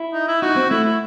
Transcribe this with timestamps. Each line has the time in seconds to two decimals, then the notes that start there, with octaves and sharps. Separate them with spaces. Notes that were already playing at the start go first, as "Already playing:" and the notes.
Already playing: E4
0.13 D#4
0.28 E4
0.42 D#4 F#4
0.56 C4
0.70 A3 E4
0.84 E4